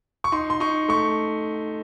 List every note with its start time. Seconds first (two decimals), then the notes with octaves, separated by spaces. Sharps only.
0.24 C#6
0.32 D#4 C6
0.50 C6
0.60 D#4 C#6
0.88 A3 C#6